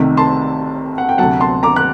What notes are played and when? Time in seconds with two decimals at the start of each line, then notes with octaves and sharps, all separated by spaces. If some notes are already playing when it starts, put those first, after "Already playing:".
Already playing: C2 C3 D#3 A3
0.17 A5 C6
0.98 F#5
1.09 G5
1.18 D2 C3 F#3 F#5 A5
1.40 A5 C6
1.63 A#5 D6
1.76 F#6